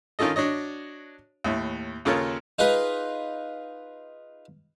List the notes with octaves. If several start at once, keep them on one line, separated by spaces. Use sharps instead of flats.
D#3 C#4 F4 A4 D#5
D4 F#4 C#5 D#5
D#2 A2 E4
D#2 C#3 F4 A4 A#4 C#5
D#4 F4 G#4 B4